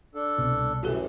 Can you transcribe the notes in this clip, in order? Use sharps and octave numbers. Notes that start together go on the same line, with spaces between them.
D4 A4
C2 B2
F#2 A2 E3 F#4 G4 A4